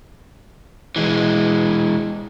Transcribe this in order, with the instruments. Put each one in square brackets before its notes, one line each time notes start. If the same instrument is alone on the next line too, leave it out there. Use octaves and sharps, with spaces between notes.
[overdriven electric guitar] E3 G#3